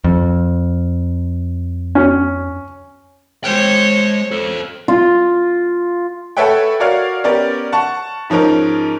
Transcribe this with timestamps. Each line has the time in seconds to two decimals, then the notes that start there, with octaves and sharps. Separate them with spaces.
0.04 F2
1.95 C#4
3.44 G#3 C5 C#5 G5
4.31 A4 C5
4.88 F4
6.37 A4 B4 C#5 E5 F#5 G5
6.80 F#4 A#4 C#5 D5 F5 F6
7.24 B3 C#4 G4 A#4 D5
7.72 F#5 A5 C#6
8.30 G#2 F3 C#4 D#4 A#4